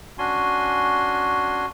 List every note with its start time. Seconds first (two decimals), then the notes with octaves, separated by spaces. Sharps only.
0.18 C#4 D4 F#4 G#5 C6